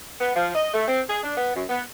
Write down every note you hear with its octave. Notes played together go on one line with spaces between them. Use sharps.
B3
F3
D#5
A3
C4
G#4
D4
B3
F#2
B3